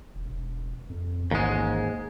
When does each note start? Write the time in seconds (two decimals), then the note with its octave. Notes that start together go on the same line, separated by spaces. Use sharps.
0.15 E1
0.28 E1
0.90 F2
1.31 A1 D#2 G#2 G#3